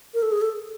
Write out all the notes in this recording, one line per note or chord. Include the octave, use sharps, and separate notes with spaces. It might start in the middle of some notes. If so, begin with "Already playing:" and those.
A#4
A4
G#4
A4